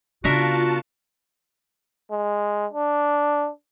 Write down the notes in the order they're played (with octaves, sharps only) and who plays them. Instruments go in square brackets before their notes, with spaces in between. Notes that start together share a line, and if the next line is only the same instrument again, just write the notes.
[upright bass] C#3 B3 [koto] D4 A#4 E5 [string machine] F4 A5 [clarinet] F#4
[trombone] G#3
D4